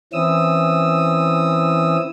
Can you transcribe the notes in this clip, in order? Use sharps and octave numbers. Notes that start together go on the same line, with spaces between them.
E3 C4 C#4 E4 D#6 E6